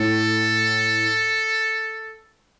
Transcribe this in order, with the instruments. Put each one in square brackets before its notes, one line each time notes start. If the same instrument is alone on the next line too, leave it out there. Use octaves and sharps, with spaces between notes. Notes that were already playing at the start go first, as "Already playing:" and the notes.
Already playing: [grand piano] A2 [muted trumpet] A4